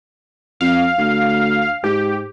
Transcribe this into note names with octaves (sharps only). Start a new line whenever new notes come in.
F2 F5
D2
G#2 G4